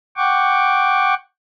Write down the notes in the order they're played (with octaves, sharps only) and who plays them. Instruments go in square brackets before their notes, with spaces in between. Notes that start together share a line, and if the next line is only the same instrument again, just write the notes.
[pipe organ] F#5 G5 C#6 D6